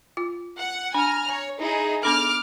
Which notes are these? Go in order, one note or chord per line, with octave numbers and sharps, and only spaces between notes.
F4
F#5
D4 G#5 A#5 F6
C#5 G#5
D#4 E4 G#4
B3 D4 A4 D6 F6